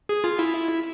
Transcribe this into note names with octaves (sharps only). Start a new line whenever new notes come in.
G#4
F4
E4